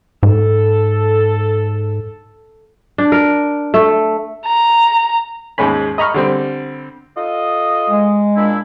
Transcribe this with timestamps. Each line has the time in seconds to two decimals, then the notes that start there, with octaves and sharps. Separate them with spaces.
0.23 G#2 A4
2.98 D4
3.12 A#4
3.74 A3
4.46 A#5
5.58 D#2 G#2 G#3 C#4 B5
5.98 D#5 A#5 B5 C#6 F6
6.14 D3 G3 C4
7.17 F4 A4 D#5
7.90 G#3
8.36 A#2 D4 E4